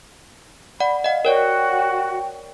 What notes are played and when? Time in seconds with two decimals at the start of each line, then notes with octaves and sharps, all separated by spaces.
0.80 D5 F#5 B5
1.04 D#5 F5 F#5
1.25 F#4 A#4 C#5 D5 G5